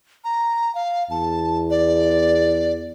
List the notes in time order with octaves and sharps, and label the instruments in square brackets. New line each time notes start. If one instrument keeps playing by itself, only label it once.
[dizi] A#5
F5
[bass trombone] E2 [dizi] A5
[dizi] D5